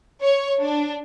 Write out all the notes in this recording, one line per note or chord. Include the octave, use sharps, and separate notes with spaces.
C#5
D4